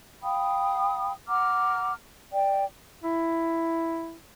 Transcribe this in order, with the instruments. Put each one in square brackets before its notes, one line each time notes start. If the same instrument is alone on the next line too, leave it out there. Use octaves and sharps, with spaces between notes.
[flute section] F5 G5 B5 D#6
F#5 A#5 D6 F6
D5 G5
[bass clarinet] E4